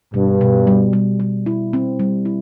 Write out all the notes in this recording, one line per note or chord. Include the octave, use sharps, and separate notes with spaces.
G2 B2
B2
G3
G3
G3
E4
C4
G3
E4